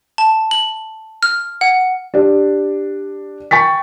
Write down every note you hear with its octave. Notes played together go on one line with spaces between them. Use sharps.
A5
F#7
F6
F#5
D4 G4 D5
G5 C#6 A6 B6